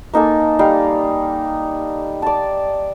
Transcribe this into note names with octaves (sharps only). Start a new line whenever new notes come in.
A#3 D#4 A4 G#5
G3 D#4 F5
D5 A5